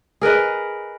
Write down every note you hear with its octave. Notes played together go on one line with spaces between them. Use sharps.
G#4 A#4 B4 D#5